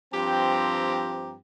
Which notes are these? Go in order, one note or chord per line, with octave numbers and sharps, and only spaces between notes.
G2 F3 C4 G4 G5 A#5